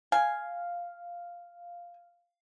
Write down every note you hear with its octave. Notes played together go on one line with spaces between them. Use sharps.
F5 G#5